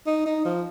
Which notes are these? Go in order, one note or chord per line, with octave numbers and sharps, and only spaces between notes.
D#4
D#4
F3